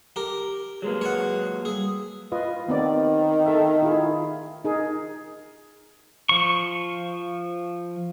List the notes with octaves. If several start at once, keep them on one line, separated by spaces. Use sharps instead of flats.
G4 A#4
F#3 G#3 A#3 G#4 B4
C#5 F#5
G3 G#4 D#6 E6
F4 B4 D#5
D#3 B3 C4 D5
A4 E5
E4 F4 G#4
D#4 G#4 A#4
F3 C#6